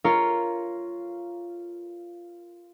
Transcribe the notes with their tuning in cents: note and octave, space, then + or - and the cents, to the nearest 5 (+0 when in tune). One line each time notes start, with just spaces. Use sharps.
F4 -10 A#4 +0 C#5 +0